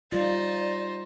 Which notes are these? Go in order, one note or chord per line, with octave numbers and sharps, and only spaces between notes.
G3 D#4 F4 C5 D5